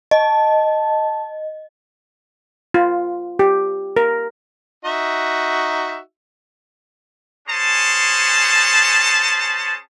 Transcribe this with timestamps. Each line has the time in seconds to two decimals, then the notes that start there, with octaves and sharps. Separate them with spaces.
0.11 D#5 A5
2.74 F4
3.39 G4
3.97 A#4
4.85 D#4 F#4 E5
7.48 C#4 G#4 C5 A5